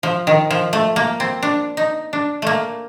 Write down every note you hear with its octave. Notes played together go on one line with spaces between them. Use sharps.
F3
D#3
F3
A3
A#3
C4
D4
D#4
D4
A3 A#3